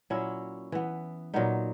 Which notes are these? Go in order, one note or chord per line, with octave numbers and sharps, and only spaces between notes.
A#2 F#3 C#4 E4
E3 B3
A#2 F#3 B3 D#4